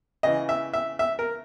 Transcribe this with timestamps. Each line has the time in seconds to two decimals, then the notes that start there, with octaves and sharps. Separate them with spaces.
0.23 C#3 E3 D#5
0.49 E5
0.73 E5
0.99 E5
1.19 A#4